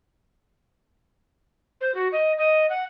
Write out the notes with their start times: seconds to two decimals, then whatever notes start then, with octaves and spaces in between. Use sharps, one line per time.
1.81 C5
1.94 F#4
2.12 D#5
2.37 D#5
2.69 F#5